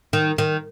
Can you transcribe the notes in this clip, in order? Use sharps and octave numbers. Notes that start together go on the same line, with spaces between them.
D#3
D#3